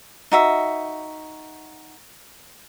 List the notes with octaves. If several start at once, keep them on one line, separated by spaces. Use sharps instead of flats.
D#4 F#4 E5